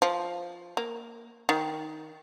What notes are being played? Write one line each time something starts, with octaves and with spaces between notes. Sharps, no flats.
F3
A#3
D#3